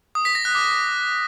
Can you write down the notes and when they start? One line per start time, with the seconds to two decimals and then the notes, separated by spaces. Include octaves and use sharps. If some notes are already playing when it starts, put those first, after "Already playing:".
0.15 D#6
0.25 B6
0.35 A#6
0.45 F#6
0.55 D6